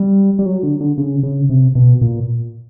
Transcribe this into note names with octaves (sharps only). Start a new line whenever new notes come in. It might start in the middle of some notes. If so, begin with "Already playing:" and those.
Already playing: G3
G3
F#3
D3
D3
C#3
C#3
C3
B2
A#2